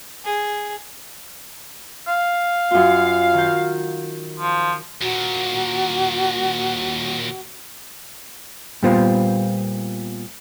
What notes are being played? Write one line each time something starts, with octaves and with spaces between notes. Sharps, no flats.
G#4
F5
F#2 F4
D#3 G6
F3
D#2 A#2 F#4
A#2 G3 B3 F4 C5 F5